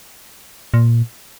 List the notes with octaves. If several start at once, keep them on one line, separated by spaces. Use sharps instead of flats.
A#2